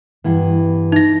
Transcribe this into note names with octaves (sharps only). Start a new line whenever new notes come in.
G2 E3 B3
D#4 A#6